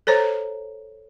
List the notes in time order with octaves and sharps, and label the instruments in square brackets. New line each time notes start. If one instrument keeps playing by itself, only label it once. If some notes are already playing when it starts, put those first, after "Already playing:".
[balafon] A4 C5 C#5 A#5